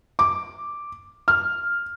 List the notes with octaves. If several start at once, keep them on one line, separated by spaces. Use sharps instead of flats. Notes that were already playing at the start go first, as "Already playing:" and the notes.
D6
F6